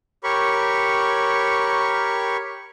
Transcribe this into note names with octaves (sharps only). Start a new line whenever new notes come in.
G4 A#4 C#5 B5 C#6